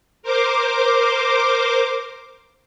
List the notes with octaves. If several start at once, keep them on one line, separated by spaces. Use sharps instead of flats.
A#4 C5 D6